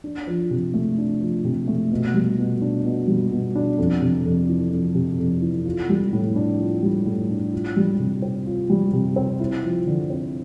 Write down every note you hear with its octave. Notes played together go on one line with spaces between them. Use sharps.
D4
F3
C3
A3
D4
F3
C3
A3
B2
G3
B2
D4
B2
G3
B2
D4
F2
C3
F2
E3
F2
C3
F2
E3
F4
G3
A2
D4
F4
G3
A2
D4
F4
G3
C3
C4
F4
G3
C3
C4
E4
F3
D3
C4